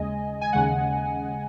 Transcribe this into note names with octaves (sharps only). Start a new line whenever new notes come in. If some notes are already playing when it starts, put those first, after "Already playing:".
Already playing: D#2 C#3 G#3 D#5 G#5
G#5
D#2 C#3 G#3 F#5